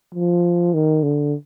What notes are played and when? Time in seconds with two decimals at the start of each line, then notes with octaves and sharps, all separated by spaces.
0.14 F3
0.74 D#3
1.03 D3